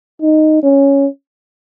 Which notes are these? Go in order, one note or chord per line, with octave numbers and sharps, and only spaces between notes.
D#4
C#4